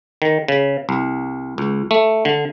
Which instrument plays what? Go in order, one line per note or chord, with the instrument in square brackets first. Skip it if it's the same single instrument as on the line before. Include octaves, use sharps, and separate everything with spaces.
[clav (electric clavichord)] D#3
C#3
C2
C#2
A3
D3